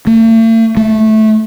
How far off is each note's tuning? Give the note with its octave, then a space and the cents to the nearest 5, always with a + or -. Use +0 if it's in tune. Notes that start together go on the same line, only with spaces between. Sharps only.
A3 +45
A3 -15